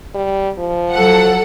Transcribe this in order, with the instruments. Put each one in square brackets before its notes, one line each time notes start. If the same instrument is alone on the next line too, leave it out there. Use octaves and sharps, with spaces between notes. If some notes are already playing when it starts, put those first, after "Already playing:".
[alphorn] G3
F3
[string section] F#3 A4 F#5